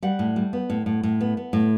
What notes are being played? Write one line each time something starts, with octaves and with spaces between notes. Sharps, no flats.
G3 F#5
A2
G3
B3
A2
A2
A2
B3
B3
A2